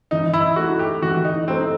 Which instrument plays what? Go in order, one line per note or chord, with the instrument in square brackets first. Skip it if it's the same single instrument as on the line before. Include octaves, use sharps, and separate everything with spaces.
[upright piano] E3 [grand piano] D#4
[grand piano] E4
[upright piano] A3 D#4 [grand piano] F#4
[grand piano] G4
[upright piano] E3 [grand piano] F#4
[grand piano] D#4
[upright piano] A3 D#4 [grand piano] C4